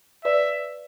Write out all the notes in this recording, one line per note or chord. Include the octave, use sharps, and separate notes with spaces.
B4 D5 E5